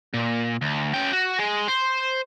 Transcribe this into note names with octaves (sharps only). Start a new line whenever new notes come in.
A#2
D2
C#3 G5
F#4
G#3
C5